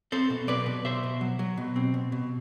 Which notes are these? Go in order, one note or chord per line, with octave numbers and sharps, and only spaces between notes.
C4 A4 C5
B2
F#3 B4 D5
B2
B2 C5 E5
B2
F#3
F#3
B2
C4
B2
B2